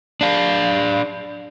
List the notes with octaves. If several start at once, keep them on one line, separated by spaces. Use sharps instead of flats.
D4 F5